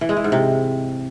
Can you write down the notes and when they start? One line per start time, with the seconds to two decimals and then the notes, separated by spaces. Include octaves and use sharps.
0.01 E3
0.09 G#3
0.17 E3
0.24 G#2
0.32 C3